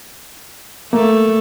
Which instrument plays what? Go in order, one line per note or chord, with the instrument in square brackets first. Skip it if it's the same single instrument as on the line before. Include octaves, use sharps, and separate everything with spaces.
[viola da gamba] A3 [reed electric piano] A#3